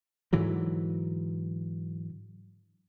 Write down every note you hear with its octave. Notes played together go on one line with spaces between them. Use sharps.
G#2 D3 E3 F#3